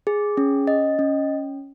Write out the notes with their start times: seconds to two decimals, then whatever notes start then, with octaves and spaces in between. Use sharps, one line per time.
0.07 G#4
0.37 C#4
0.67 D#5
0.99 C#4